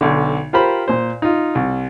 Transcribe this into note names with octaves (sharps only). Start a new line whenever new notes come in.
B1 D3
F4 G4 A#4 C5 B5
A#2 C5
D#4 F4
C2